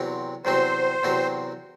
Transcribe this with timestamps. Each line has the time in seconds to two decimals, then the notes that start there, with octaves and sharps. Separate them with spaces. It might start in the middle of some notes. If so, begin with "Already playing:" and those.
Already playing: E2 C3 F#3 C4
0.45 E2 C3 F#3 C4 C5
1.03 E2 C3 F#3 C4